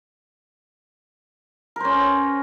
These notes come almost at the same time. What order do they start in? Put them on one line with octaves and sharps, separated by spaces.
A#4 C5 C#4